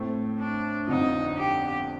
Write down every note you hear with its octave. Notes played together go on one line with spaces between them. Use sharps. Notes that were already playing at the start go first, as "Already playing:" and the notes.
Already playing: A2 A3 C4
D4
G1 F2 D3 F3 D#4
G4